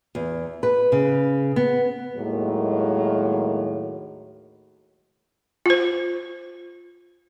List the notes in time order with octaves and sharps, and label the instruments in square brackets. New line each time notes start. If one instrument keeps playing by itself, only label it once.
[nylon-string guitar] E2
B4
C#3
B3
[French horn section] D#2 A2 D#3 F#3 G#3 A#3
[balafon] F4 C5